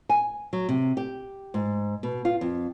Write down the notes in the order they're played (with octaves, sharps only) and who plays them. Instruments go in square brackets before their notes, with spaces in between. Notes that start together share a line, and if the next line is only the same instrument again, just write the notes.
[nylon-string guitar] G#5
F#3
C3
G4
G#2
B2
F4
F2